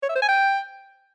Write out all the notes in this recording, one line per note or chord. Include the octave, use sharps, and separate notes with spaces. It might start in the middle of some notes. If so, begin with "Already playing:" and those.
C#5
E5
C5
G#5
G5